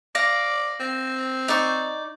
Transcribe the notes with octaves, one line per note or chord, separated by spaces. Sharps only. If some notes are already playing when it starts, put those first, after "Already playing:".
D5 F5 A#6
C4
D#4 D5 C#6